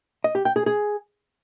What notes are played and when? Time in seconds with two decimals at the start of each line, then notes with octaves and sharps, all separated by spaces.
0.24 D#5
0.35 G4
0.45 G5
0.56 G#4
0.66 G#4